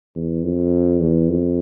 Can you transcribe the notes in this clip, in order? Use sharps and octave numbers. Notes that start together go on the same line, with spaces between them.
E2
F2
E2
F2